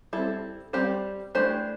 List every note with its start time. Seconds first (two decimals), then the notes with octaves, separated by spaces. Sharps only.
0.13 G3 C4 E4 A4
0.73 G3 C4 G4 C5
1.35 E3 A3 D4 G4 C5